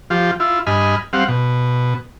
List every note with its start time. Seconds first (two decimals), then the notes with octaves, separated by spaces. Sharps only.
0.10 F3 F4 G4
0.40 E4 F4
0.67 G2 D#5 G#5 B5 F6
1.13 G3 C4 F5 F#5
1.28 B2